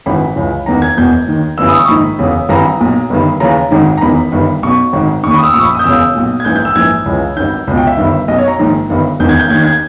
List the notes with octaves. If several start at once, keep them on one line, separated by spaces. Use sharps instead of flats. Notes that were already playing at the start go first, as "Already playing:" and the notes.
G#1 G#2 E3 B5
C#2 C#3 E3
E1 E2 D#3 A#5
G#6
E1 E2 B2 G6
D#2 D#3
G1 G2 E3 E6
D#6
C#6
A#1 G#2 D#3 B5
E1 E2 C#3
G#1 G2 E3 A#5
B1 A#2
G1 G2 D#3
D#2 C#3 E3 A#5
G#1 G#2 D#3
A#5
E1 E2 D#3 B5
G1 G2 D#3
B1 B2 C#6
G#1 G#2 D#3
D#2 D#3 C#6
B5
D#6
E6
A#1 A#2 C#6
B5
D#6
G6
E1 E2 C#3 E6
B1 A#2
G#6
A#1 G#2 E3 G6
G6
E6
A#1 G#2 E3 G#6
C#2 C#3 E3
G#1 G2 D#3 G6
C#2 B2
G5
E5
G1 G2 D#3
B1 B2 D#5
C#5
A#5
A#1 G#2 D#3
G1 G2 D#3
E1 E2 D#3 G6
G#6
G6
D#2 D#3 G#6
G#6